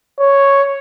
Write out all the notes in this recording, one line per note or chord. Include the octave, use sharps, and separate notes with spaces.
C#5